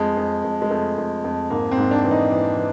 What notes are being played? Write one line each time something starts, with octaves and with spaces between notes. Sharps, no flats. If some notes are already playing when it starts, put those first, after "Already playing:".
Already playing: F2 G#3
F2
F2
G#3
F2 A3
F2
F2
G#2 A#3
C4
G#2
D4
E3
D#4
E3
E3